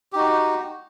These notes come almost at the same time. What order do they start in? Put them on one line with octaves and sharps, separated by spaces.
G4 D#4 F#4